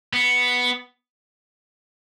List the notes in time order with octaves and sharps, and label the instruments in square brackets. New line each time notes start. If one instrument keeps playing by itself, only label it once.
[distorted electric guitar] B3